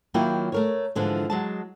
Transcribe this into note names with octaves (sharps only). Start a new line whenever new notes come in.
D#3 F#3 A#3 E4 F4 G5
A3 A#4 C#5
G#2 D3 E3 F3 G#3
F#3 G#3 A5